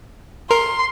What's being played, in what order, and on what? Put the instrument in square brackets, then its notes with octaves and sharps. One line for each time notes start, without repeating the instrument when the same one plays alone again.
[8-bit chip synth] A#4 [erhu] C6